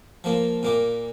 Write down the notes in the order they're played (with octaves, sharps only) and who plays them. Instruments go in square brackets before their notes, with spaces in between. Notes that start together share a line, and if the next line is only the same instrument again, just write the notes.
[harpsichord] F3 A#3
A#2 A#3 D6